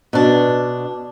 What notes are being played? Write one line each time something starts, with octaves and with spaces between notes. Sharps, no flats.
B2 D4